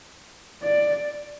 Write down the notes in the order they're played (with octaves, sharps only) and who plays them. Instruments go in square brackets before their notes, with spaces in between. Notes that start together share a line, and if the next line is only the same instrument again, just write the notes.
[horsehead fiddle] D5